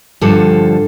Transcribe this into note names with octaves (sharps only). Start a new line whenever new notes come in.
G2 D3 F3 A4